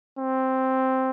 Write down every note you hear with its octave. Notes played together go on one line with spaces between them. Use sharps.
C4